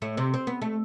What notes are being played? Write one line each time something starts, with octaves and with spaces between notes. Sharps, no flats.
A2 A3
C3 C4
C4
B3
A3